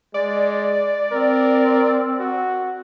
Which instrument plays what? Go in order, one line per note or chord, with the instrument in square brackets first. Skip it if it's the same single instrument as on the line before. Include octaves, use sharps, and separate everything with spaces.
[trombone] G#3 [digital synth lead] D5
[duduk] C4 [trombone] A#4
[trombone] F#4